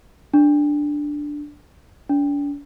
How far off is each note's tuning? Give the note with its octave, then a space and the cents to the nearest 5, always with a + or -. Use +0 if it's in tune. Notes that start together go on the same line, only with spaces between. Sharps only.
D4 +0
D4 -40